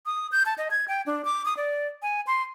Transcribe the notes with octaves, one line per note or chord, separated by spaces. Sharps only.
D#6
G6
A5
D#5
G#6
G5
D4
D6
D#6
D5
G#5
C6